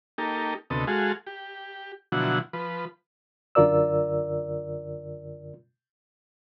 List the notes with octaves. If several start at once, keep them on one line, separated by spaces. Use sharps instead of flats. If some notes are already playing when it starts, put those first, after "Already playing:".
A#3 D#4 G4 A4
D2 C3 B3 A4 D#5
G#3 F#4 G#4 A4 F5
G4
B2 D3 F3 F#3 E4 F#5
F3 B4
F#2 D3 F4 A#4 D5 E6